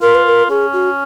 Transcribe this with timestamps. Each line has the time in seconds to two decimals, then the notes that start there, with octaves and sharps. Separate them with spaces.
0.02 F4 A#4
0.15 B4
0.27 A#4
0.50 C#4 G#4
0.73 F#4